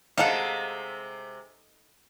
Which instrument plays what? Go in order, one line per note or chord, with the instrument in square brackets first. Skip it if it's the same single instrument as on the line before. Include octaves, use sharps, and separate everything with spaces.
[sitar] C3 G#3 [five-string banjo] D#4 A4 [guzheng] F5 F#5